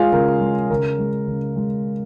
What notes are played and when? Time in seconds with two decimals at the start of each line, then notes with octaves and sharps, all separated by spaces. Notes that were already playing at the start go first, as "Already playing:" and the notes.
Already playing: G#3 F4 G#4 C#5 F5 G#5
0.12 C#3 A#4
0.41 G#3
0.70 C#3 A#4
0.99 G#3
1.28 C#3
1.56 G#3